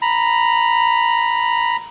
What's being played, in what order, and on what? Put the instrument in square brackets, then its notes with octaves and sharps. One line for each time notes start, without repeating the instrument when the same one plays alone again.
[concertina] A#5 B5